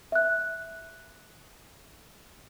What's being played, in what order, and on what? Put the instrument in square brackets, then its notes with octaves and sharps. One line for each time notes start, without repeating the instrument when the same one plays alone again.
[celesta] E5 F#6